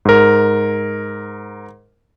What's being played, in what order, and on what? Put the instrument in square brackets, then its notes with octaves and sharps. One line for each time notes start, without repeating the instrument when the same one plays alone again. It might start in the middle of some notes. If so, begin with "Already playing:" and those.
[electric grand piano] G#2 A#4